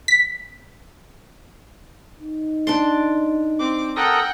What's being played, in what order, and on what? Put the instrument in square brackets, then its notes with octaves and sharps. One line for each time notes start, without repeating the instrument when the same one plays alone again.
[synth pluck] B6
[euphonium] D#4
[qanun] D4 D5 C6
[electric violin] C4 D6
[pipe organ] A4 A#4 D#6 [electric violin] F#5 G5